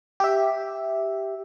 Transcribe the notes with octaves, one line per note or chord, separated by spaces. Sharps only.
G4 E5